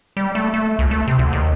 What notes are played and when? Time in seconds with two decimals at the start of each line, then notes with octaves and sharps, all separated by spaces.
0.17 G3
0.35 A3
0.54 A3
0.79 C#2
0.91 A3
1.07 C3
1.19 D2
1.33 D#2